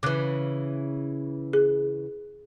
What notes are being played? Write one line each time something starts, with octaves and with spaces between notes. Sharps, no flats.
C#3 E3 D6 F#6
G#4